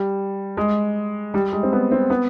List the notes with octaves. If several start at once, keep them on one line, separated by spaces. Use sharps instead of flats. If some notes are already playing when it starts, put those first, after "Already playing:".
Already playing: G3
G#3
G3
G#3
C4
B3
C4
B3